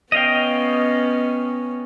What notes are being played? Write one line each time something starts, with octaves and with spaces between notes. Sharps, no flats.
B3 C#4 D#5 F5 G5